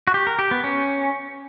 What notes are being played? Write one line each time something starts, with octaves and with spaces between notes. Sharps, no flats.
F#4
G4
A#4
G4
B3
C#4